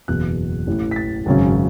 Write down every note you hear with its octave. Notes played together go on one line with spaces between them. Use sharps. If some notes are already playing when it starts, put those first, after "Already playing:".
F#1 E2 B2 F#6
A1 A2 E3
B6
A6
G#1 F#2 C#3